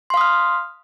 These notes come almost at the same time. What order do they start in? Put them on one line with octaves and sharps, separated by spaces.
C6 F5 D#6 F6